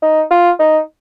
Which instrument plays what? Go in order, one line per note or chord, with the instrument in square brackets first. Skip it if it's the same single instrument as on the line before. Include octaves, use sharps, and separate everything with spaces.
[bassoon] D#4
F4
D#4